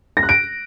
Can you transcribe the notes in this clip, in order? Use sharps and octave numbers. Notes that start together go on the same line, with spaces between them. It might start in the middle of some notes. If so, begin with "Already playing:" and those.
A#6
F#6
D7